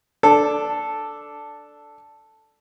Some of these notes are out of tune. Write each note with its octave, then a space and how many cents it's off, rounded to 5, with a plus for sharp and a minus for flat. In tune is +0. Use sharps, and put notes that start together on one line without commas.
D4 +0 A4 +0